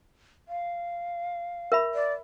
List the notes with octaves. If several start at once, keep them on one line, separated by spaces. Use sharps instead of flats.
F5
A#4 E5 B5
D5